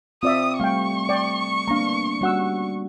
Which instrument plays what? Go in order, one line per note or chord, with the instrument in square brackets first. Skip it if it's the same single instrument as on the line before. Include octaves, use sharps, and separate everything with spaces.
[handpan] C4 [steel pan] F4 D5 E5 [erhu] D#6
[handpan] G3 A3 [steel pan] F5 G5 [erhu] C#6
[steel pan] D5 G5
[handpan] A#3 B3 D4 [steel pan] F5 A#5
[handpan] G3 F#4 [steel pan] C#4 F#5 E6